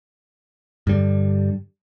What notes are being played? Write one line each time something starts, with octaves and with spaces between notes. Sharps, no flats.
G2 D3 G3